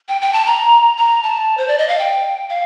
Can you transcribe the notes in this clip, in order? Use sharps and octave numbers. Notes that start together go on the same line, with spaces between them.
G5
G5
A5
A#5
A#5
A5
C5
D5
D#5
F5
G5
F5